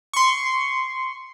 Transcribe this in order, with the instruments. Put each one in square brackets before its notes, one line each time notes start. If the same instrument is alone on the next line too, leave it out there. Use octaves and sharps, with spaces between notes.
[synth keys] C6 C#6